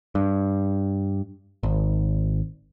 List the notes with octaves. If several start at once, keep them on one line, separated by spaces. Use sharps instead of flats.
G2
G#1